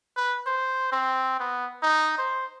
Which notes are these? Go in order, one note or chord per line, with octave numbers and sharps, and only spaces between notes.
B4
C5
C4
B3
D#4
C5